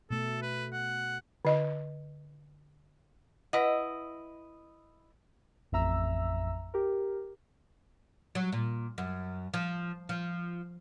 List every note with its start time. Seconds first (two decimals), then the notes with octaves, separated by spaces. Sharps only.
0.10 B2 A3 A4
0.42 B4
0.73 F#5
1.45 D3 D#5
3.53 E4 B4 D#5 F#5
5.72 A1 F2 E5 A#5 E6
6.74 G4 A#4
8.35 F#3
8.53 A#2
8.98 F#2
9.54 F3
10.09 F3